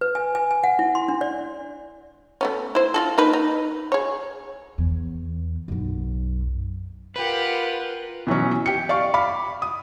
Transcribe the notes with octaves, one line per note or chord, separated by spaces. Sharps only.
B4
G#5
G#5
G#5
F#5
E4
C6
D4
D5
A3 B3 C#4
E4 C5
F4 F#4 A4
A#3 D#4 B4
D#4
G#4 C#5
E2
B1 F#2
F4 G4 A#4 B4 F#5
B2 E3 F#3 C#4
G4 C#7
D5 F5 C#6
F5 B5 D6
D#6